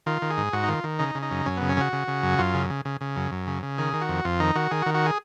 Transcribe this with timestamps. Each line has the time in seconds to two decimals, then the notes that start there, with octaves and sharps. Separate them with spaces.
0.06 D#3 F4
0.22 D#3
0.30 G#4
0.37 G#2
0.53 G#2 F#4
0.63 D#4
0.69 D#3 F4
0.84 D#3
0.99 C#3 D#4
1.15 C#3
1.22 D#4
1.31 F#2
1.46 F#2 C#4
1.57 C#3 B3
1.69 C#4
1.77 C#3 F#4
1.93 C#3
2.08 C#3
2.23 F#2
2.38 F#2 F4
2.54 C#3
2.70 C#3
2.85 C#3
3.01 C#3
3.16 F#2
3.32 F#2
3.47 C#3
3.63 C#3
3.78 D#3 G#4
3.94 D#3
4.01 F#4
4.09 F2
4.25 F2 F4
4.40 D#3 D#4
4.55 D#3 F#4
4.71 D#3 G#4
4.82 F#4
4.86 D#3
4.94 F#4
5.06 G#4